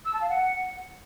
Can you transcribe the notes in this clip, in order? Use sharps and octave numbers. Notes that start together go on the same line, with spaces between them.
E6
A5
F5
F#5